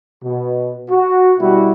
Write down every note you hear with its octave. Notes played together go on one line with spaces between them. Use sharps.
B2
F#4
B2 G3 E4 F#4